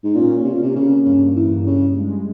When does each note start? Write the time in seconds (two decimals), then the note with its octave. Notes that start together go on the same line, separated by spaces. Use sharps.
0.04 G#2
0.15 A#2 C#4
0.44 C3
0.53 A#2
0.60 C3 A#3
0.75 C#3
1.05 G2 C#3
1.36 E3
1.50 G2
1.66 C#3
1.97 G#3